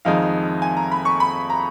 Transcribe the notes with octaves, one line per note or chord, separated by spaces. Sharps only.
F1 F2 D#3 G#3 D#4 F5
G#5
A#5
B5
C#6
B5
A#5